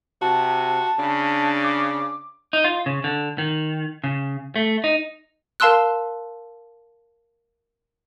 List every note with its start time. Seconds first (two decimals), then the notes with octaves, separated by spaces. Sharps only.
0.22 C3 F#4 A5
0.99 C#3 D4
1.64 D6
2.53 D#4
2.64 F4
2.86 C#3
3.04 D3
3.38 D#3
4.04 C#3
4.56 A3
4.84 D#4
5.60 A#4 F5 A5 C6 E6 F#6